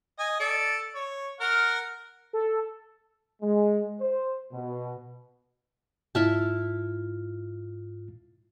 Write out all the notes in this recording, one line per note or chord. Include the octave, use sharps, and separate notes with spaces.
D#5 G#5
A4 D5
C#5
A#4 F#5 F6
A4
G#3
C5
B2
G#2 E4 F4 E5 A5 F6